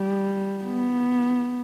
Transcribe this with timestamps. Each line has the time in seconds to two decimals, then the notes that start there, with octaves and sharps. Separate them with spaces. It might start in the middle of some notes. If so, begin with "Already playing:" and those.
Already playing: G3
0.65 B3